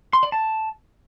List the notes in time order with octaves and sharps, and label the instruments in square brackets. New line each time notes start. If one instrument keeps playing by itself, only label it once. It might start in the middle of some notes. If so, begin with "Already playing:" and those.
[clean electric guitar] C6
D5
A5